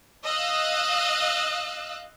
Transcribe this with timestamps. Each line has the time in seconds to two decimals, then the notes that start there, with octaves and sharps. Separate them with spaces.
0.24 D#5 F5 E6 F#6